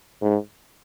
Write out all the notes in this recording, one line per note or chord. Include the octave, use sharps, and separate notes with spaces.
G#2